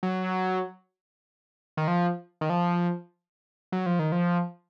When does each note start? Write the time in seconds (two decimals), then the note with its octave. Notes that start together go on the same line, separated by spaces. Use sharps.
0.03 F#3
1.77 D#3
1.88 F3
2.41 D#3
2.50 F3
3.72 F#3
3.86 F3
3.99 D#3
4.12 F3